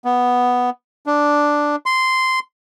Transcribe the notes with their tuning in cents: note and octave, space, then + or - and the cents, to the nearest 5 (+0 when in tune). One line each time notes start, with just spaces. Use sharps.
B3 +0
D4 +0
C6 -10